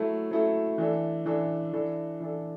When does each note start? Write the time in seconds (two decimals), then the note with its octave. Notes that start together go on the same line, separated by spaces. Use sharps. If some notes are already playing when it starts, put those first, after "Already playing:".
Already playing: F#3 A3 E4 A4
0.31 F#3 A3 E4 A4
0.78 E3 D4 A4
1.25 E3 D4 A4
1.73 E3 D4 A4
2.20 E3 D4 A4